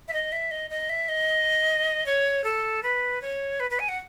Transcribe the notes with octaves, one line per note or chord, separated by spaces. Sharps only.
E5
D#5
E5
D#5
D#5
E5
D#5
C#5
A4
B4
C#5
B4
B4
G#5
F#5